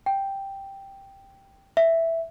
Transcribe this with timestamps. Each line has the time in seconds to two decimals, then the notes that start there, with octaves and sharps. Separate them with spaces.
0.06 G5
1.77 E5